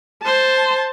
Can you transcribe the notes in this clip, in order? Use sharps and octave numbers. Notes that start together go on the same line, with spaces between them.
C5 A5